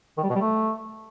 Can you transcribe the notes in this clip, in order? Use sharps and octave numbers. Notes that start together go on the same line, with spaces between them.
D#3
G3
B2
G3
A3